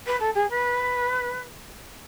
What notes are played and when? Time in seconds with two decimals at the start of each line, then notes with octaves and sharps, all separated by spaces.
0.06 B4
0.20 A4
0.35 G#4
0.49 B4